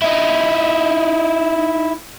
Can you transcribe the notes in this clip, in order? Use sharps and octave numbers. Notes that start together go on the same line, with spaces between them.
D#4 E4